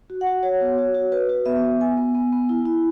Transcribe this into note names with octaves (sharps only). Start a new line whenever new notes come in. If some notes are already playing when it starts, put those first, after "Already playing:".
F#4
F#5
F#4
F#4 C#5
B3
F#4
F#4
F#4 B4
F#4
B3 E5
B3
B3 G#5
B3
B3
B3
E4
E4